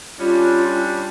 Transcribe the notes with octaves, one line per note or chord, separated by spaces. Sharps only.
G3 C#4 D4 F4